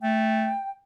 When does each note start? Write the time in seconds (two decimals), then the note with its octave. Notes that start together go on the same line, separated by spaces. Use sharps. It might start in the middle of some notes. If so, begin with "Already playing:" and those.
0.02 A3 G5